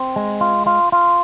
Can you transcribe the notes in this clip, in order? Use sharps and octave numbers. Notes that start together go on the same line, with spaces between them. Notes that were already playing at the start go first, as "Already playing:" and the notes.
Already playing: C4
G#3
F4
F4
F4